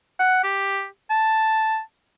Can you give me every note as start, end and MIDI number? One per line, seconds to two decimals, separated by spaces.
0.20 0.40 78
0.44 0.86 67
1.10 1.80 81